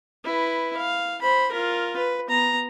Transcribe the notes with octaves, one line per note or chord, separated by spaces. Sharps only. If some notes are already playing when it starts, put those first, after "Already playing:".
E4 B4
F5
C5 B5
F4 A#4
B4
B3 A#5